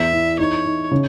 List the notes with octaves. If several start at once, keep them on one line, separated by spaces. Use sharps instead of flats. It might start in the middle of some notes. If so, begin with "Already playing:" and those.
Already playing: E2 E5
E3
D#4 C#5
D#4
C#3